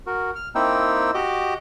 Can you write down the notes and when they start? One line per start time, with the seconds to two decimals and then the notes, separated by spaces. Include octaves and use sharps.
0.07 F#4 A#4
0.36 F6
0.55 A#3 C4 D#4 E4 G5 E6
1.14 F#4 G4 D#5 D6